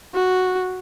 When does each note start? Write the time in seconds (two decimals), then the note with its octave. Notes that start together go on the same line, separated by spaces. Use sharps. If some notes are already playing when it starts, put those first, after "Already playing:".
0.15 F#4